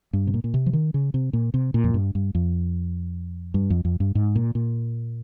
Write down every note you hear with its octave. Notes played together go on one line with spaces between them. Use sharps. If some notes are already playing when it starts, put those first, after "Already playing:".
G2
C3
A#2
A#2
C3
F3
D#3
C#3
C3
A#2
C3
A#2
F2
G2
G2
F2
G2
F2
F2
G2
G#2
A#2
A#2